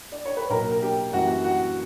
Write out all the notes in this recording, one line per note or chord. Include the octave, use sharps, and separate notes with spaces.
D5
C#5
B4
B1 A#2 F#3 A#4
A#4
G4
F#2 E3 G3 A#3 F#4
F#4